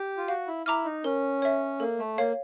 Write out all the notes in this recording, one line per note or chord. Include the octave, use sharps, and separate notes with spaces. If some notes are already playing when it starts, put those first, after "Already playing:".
Already playing: G4
F4
F#4 F5
E4
E4 A#5 D6 F6
D#4
C#4 A#4
C#5 E5
A#3 A4
A3
A#3 C#5 F5